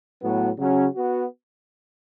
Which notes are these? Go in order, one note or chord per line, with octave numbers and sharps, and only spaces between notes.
A2 F#3 B3 F#4
C#3 F#3 C#4 F#4
B3 F#4